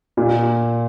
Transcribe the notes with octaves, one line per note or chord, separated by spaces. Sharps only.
A#2